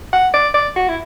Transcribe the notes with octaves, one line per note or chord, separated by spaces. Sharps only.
F#5
D5
D5
F#4
E4